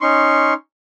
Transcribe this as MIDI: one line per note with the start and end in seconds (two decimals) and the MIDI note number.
0.01 0.54 61
0.01 0.54 63
0.01 0.54 84
0.01 0.54 85